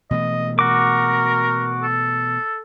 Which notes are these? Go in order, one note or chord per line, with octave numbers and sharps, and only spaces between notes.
B2 E3 A3 D#5
F#4 A#4 D6
A4